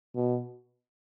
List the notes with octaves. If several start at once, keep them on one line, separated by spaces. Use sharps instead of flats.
B2